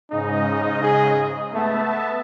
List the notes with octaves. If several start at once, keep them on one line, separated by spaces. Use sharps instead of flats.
G#2 C#3 D#4 D#5
G#4
A3 B3 E5 A5